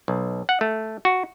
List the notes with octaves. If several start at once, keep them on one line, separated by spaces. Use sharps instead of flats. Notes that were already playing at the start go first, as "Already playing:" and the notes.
B1
F#5
A3
F#4